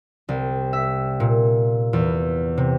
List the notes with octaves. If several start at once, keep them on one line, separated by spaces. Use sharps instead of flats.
C2
E5
A#2
E2
C3